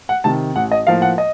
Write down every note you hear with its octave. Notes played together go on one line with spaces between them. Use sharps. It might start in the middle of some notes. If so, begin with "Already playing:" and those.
F#5
C3 D#3 A5
A1 F#5
D#5
A2 F3 A#3 F5
F#5
D#5